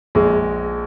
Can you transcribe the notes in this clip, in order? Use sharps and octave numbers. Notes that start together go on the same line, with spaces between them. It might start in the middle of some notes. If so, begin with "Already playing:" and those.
A#1 G#3